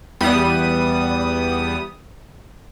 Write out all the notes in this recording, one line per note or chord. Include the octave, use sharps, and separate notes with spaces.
E2 G3 B3 D#6